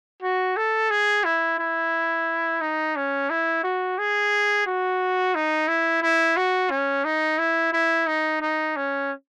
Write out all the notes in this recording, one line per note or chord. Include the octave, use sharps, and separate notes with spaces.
F#4
A4
G#4
E4
E4
D#4
C#4
E4
F#4
G#4
F#4
D#4
E4
E4
F#4
C#4
D#4
E4
E4
D#4
D#4
C#4